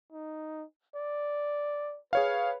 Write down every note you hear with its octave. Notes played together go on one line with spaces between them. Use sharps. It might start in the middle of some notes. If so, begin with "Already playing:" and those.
D#4
D5
G#4 B4 C#5 F5